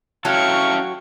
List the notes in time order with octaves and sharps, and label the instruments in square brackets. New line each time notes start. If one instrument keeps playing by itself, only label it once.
[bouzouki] F#3 F#4 [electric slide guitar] C#4 E4 A4 [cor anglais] F5 [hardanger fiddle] G5 C#6